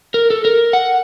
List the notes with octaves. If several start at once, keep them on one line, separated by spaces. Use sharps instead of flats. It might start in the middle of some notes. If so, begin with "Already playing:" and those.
A#4
A4
A#4
F#5